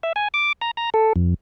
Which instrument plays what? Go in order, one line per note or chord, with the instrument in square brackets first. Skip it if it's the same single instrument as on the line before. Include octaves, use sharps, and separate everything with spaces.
[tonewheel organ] E5
G#5
D6
A#5
A#5
A4
F2